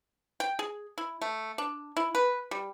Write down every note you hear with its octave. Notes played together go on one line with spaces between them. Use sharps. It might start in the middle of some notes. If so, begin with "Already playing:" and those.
G5
G#4
E4
A3
D4
E4
B4
G3